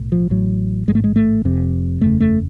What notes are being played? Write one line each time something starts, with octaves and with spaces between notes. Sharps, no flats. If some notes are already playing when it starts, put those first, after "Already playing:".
Already playing: B1 A2
F3
A1 A2 F#3
A1 G#2 G#3
A3
G#3
A3
F1 F2 C3
F#1 E2 C#3 A3
A3